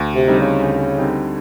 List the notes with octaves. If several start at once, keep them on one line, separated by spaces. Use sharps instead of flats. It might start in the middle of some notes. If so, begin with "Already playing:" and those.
Already playing: D2
C3
D3 G3 C4 D#4
C#3
D2
D3 G3 C4 D#4